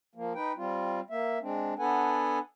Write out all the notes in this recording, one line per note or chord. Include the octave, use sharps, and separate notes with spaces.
F3 A#3
D#4 B4 G5
G3 C4 F4
A#3 E5
G#3 C4 D4
B3 D4 A4 B4 F#5 G#5